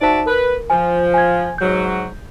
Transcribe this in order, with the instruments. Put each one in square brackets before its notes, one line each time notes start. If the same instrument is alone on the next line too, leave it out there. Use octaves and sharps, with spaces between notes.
[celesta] D#4 C5 A5 [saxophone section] F#4 D5 E5
[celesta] A#4 [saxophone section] B4
[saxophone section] F3 [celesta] G#5
[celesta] G#5 G#6
[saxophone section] G#2 F#3 [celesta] G6